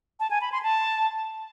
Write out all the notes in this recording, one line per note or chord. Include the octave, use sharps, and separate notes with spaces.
A5
G#5
B5
C6
A5